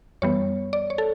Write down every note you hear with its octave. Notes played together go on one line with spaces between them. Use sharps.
F#2 E3 G3 B3 C#5
D5
C#5
A4